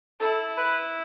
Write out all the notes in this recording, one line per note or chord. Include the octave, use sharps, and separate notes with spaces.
E4 A4
B4